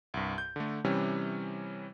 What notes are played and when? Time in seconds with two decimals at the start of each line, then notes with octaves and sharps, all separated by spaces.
0.14 C2 G2
0.38 G6
0.56 D3 A3
0.84 C3 E3 G3 C#4